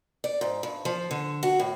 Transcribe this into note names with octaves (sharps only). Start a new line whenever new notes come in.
D5
G#2
G2
F3
D3
F#4
A2